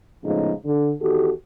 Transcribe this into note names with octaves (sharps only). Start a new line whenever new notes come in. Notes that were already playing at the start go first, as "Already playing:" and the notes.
A2 C#3 F3 G#3 B3 D#4
D3
E2 D#3 F#4 G4 A4